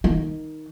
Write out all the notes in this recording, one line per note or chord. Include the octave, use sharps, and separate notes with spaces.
D#3